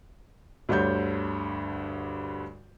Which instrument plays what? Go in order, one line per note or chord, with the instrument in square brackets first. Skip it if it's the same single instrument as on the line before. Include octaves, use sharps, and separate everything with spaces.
[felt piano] D2 G2 D3 C#5 G6